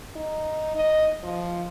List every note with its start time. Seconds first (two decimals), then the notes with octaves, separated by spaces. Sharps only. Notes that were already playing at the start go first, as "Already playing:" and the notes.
0.16 D#4
0.76 D#5
1.23 F3